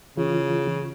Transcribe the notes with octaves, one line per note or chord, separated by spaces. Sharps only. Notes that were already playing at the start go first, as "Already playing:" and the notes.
C#3 E3 F4